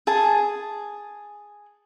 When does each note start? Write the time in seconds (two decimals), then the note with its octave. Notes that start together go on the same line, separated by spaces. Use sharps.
0.07 G#4 G#5 A5